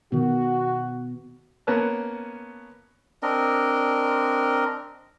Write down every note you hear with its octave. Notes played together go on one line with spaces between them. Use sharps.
B2 D#3 B3 F#4
A#3 B3 C#4 A5 F#6
C4 D4 A#4 D#5